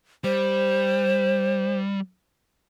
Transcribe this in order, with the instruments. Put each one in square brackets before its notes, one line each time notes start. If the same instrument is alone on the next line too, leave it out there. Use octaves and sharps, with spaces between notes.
[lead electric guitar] G3 [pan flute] C5